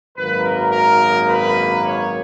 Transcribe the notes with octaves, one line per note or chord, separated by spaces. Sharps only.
G#1 F#2 D#3 F#3 A#3 B4
A#4
A#4
B4
C#5